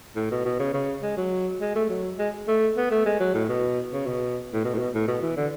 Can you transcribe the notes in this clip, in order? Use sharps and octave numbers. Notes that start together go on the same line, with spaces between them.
A2
B2
B2
C#3
C#3
G#3
F#3
G#3
A3
F#3
G#3
A3
B3
A3
G#3
F#3
A2
B2
C#3
B2
A2
B2
A2
B2
A2
B2
E3
D3